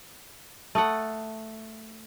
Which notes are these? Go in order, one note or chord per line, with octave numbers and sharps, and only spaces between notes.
A3 A4 F#5 A5 D#6